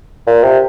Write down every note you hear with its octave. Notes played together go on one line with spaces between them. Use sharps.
A#2
C3